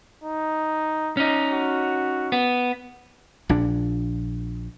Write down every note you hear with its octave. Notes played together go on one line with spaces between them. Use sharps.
D#4
C#4 D#4
F#4
B3
A#1 A#2 D4